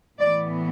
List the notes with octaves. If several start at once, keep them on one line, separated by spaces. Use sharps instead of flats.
A2 E3 B3 D5